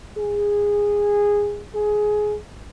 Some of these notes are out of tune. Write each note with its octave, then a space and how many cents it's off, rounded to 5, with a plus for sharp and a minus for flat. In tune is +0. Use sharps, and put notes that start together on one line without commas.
G#4 -15
G#4 +15